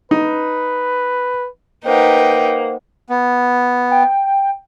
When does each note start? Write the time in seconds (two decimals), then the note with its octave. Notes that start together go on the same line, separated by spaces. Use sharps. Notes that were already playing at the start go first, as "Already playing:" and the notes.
0.11 D#4 B4
1.86 A#3 D#4 B4 C5 F#5 G5
3.09 B3
3.91 G5